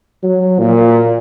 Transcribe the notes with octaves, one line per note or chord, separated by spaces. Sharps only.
F#3
A#2